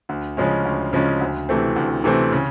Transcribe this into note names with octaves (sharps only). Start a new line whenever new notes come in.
D2
C#3 F3 G#3 C#4
D2
C#3 F3 G#3 C#4
D2
C3 E3 A3 C4
D2
C3 E3 A3 C4
C#3